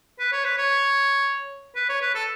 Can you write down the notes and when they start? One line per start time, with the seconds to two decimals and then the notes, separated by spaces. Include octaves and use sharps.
0.19 B4
0.32 C#5
0.45 B4
0.58 C#5
1.76 B4
1.89 C#5
2.02 B4
2.15 A4